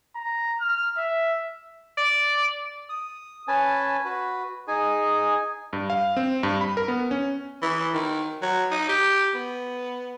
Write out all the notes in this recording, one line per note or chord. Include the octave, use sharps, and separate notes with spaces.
A#5
F6
E5
D5
D#6
C#4 B4 G#5 A5
F#4 B4
D#4 G#4 G#5
G2
F5
C4
G2
B5
A#4
B3
C#4
E3
D#3
F#3
D#4
G4
B3